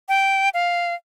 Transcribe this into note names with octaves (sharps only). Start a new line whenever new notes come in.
G5
F5